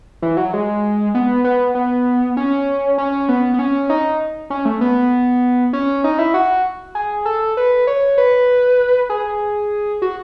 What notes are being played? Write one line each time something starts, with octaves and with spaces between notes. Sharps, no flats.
E3
F#3
G#3
B3
B3
B3
C#4
C#4
B3
B3
C#4
D#4
C#4
A3
B3
C#4
D#4
E4
F#4
G#4
A4
B4
C#5
B4
G#4
F#4